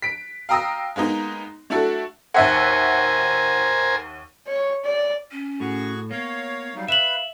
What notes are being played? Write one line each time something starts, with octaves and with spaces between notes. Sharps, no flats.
B6 D7
F5 G5 A#5 D#6 E6 A#6
G#3 A#3 B3 D#4
A3 D4 E4 F#4 A4
D#2 A#4 C5 E5 F#5 G#5
C#5
D5
C#4
A2 F#4 G#4 C#6
A#3 B3 C#5 F5
F#3 G3 D#4 F5
B4 E5 B5 E7 F#7